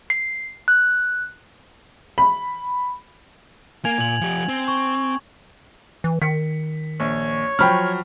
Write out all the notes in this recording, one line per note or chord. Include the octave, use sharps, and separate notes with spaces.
C7
F#6
B5
A#3 G#5 G#6 F7
A#2 G#6 F#7
F3 G4
C4
C#6
E3
D#3 B6 C#7
A#1 C#5 C#6
F3 F#3 G5 B5 F6